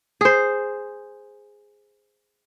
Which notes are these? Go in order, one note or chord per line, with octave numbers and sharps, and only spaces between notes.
G#4 C5